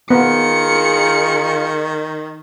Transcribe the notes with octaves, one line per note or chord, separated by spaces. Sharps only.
D#3 B3 F4 G#4 A#4 C#7